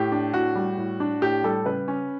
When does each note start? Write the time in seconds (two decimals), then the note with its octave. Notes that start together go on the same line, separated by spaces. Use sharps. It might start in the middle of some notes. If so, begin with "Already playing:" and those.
Already playing: A2 G4
0.12 D4
0.34 A2 F#4
0.55 G3
0.78 A2
1.00 D4
1.22 A2 G4
1.44 G3 A4
1.65 C#3 B4
1.88 C#4